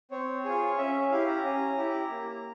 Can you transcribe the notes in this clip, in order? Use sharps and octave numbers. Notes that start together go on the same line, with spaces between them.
C4 C#5
F4 G#4
C#4 E5
E4 G4 F5
A#5
C#4
E4 G4
A#3